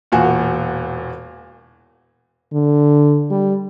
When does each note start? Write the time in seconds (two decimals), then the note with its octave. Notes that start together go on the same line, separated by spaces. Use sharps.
0.12 E1 A#2 F#4 G#5
2.53 D3
3.30 G3